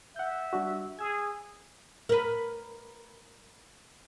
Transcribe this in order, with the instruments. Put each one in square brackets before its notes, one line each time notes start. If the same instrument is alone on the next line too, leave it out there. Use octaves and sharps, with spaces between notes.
[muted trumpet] E5 [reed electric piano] F#5 G6
[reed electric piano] G3 D4 F#4
[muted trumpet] G#4 [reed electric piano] E6 G#6
[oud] A#4 B4